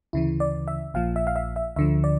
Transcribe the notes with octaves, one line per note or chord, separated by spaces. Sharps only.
D2 C#3 E3 E4
D5
E5
A#1 A#2 F3 F5
E5
F5
E5
E5
D2 D3 F3 E5
D5